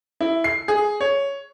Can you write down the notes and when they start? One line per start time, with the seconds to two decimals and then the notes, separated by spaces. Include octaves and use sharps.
0.20 E4
0.44 C7
0.68 G#4
1.01 C#5